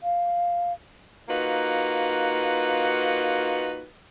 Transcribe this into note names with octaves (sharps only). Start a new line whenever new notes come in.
F5
A#3 D#4 F4 F#4 B4